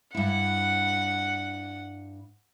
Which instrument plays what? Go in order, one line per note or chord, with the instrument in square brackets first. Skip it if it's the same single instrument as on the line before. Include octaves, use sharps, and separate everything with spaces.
[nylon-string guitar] G2 E4 [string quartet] F#5